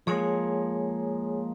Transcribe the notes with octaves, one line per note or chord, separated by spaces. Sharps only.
F3 G#3 A#3 G#4 C#5 G#5